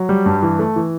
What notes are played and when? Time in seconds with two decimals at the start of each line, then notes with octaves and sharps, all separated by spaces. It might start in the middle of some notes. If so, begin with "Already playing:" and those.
Already playing: F#3
0.09 G3
0.26 G2
0.43 E3
0.59 A3
0.76 E3